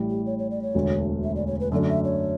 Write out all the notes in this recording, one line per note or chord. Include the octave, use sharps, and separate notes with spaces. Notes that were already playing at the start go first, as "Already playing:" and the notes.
Already playing: A1 A2 G3
G4
C#5
C#5
D5
C#5
E1 D2 D3 A3
E5
D5
C#5
B4
F#2 D3 A3 D4 F#4
D5
E5
C#5